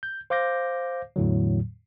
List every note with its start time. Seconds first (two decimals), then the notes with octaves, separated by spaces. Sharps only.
0.03 G6
0.30 C5 F5 D6 G6 A#6
1.16 E2 A2 D3 F#3